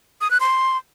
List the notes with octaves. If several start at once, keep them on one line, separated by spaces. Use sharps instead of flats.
D#6
F#6
C6